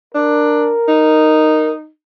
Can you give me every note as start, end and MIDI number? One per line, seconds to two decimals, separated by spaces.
0.14 0.72 62
0.14 1.72 70
0.88 1.89 63